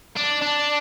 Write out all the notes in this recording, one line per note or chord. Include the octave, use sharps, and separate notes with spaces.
D4
D4